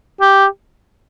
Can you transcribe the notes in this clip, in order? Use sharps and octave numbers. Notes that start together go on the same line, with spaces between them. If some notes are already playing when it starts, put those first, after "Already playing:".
G4